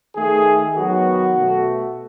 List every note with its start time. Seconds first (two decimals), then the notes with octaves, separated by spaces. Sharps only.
0.16 D#3 A3 G#4
0.76 D#3 F#3 B3 F#4
1.37 B2 A3